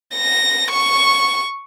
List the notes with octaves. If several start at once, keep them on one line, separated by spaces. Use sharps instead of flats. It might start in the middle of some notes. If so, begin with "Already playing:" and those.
A#6
C#6